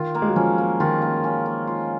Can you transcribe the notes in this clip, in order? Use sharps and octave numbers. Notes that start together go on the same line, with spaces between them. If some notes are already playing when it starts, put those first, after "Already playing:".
Already playing: D#3 F4
A#3
G#3
F#3
F3 C#4
A#3
D#3 F4
A#3
C#4
A#3
F4